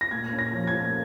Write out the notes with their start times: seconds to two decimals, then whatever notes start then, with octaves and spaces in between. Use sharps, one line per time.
0.01 A#6
0.11 A#2 G#6
0.33 C#4
0.39 A#6
0.53 F3
0.67 G#6
0.74 A#3